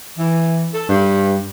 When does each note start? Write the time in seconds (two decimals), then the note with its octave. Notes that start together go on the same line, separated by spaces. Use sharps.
0.18 E3
0.74 A4
0.89 G2